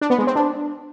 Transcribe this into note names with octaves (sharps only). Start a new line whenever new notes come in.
D4
B3
G#3
C4
D4